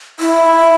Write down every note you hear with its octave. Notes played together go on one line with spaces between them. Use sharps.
E4